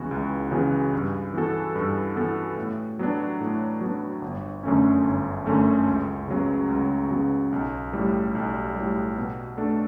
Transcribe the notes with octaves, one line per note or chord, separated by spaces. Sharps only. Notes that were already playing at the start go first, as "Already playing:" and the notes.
Already playing: C#2 C#3 E3 B3 F#4
C#2
C#3 E3 B3 F#4
G2
E3 B3 F#4 A4
G2
E3 B3 F#4 A4
A2
F#3 B3 D4
A2
F#3 B3 D4
G1
F#2 D3 A3 C#4
G1
F#2 D3 A3 C#4
C#2
C#3 F#3 B3
C#2
C#3 F#3 B3
B1
A2 G3
B1
A2 G3
B2
A3 D4 A4